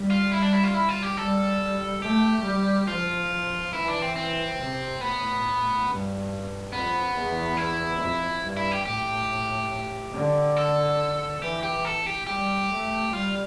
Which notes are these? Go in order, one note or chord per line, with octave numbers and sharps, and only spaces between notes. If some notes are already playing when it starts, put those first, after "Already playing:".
Already playing: G3
F4
E4
D4
E4
F4
E4
F4
G4
G3 A4
A3 G4
G3
F3 F4
E3 E4
D4
C4
C4
C3
A2 B3
G2
F2 B3
E2
E4
F2
G2
E4
G4
A2 G4
D3
A4
E3 G4
G4
A4
G4
G3 G4
A3
G3 F4